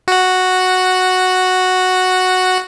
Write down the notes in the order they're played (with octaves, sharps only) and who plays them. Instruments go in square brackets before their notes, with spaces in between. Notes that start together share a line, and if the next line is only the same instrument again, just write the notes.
[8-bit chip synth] F#4 F#5